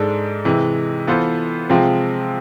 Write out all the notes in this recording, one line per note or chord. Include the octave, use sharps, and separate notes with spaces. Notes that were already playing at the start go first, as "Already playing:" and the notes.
Already playing: G#2 G#3 D4 A4
C3 E3 G#3
E3 B3 F4 A4 C5
C3 F3 G#3 C4 F4